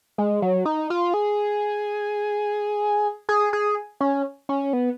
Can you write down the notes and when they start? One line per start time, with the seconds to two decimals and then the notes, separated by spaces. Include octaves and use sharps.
0.18 G#3
0.42 F#3
0.65 D#4
0.90 F4
1.14 G#4
3.29 G#4
3.53 G#4
4.01 C#4
4.49 C#4
4.73 B3